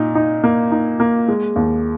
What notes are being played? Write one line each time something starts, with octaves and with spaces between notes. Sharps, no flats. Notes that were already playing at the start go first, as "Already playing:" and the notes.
Already playing: A#2 D#4
D#4
A#3
D#4
A#3
G#3
D#2